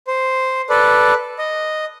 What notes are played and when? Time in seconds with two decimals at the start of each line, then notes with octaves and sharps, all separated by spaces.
0.07 C5
0.70 A4 B4 D5
1.39 D#5